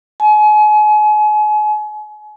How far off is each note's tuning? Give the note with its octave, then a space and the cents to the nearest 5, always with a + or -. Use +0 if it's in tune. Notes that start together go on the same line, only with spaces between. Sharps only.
G#5 +35